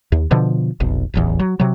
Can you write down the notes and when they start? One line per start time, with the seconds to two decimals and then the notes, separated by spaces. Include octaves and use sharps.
0.12 D#2
0.31 B2 D3 F3
0.80 F1 B1
1.14 D1 A1 E2
1.40 F#3
1.60 C3 F#3